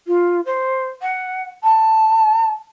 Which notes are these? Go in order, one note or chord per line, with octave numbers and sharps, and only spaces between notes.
F4
C5
F#5
A5